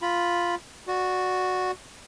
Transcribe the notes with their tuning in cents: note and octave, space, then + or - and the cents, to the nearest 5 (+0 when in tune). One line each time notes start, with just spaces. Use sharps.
F4 +0 B5 -5
F#4 -5 D5 +0